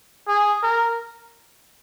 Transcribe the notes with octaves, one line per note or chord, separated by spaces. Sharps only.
G#4
A#4